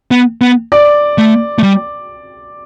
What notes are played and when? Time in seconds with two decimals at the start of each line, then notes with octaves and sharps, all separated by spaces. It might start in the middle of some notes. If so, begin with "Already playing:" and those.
0.11 B3
0.41 B3
0.72 D5
1.18 A3
1.58 A3
1.63 G3